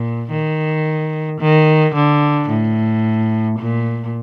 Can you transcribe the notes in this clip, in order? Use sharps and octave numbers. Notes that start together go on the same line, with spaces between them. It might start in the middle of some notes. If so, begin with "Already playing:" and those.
Already playing: A#2
D#3
D#3
D3
A2
A#2